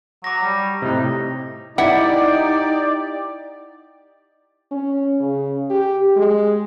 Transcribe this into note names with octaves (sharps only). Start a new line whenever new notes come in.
F#3 D6 A#6
G3
A2 C3 D#4
D#4 E4 G4 D5 F#5
C#4
C#3
G4
G#3